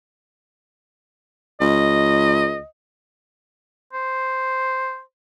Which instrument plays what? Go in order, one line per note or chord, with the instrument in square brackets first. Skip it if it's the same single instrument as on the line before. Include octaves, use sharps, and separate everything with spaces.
[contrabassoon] C#2 [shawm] D#5
[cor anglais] C5